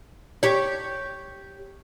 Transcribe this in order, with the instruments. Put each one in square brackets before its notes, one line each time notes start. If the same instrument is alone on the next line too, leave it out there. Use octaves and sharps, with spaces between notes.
[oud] G4 C#5